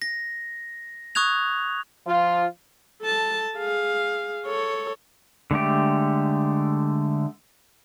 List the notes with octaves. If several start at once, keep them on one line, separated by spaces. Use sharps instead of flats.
A#6
C#6 D#6 F#6 G#6 F7
F3 F4
A4 A5
G#4 F5
A4 C#5
D3 G#3 A3 G4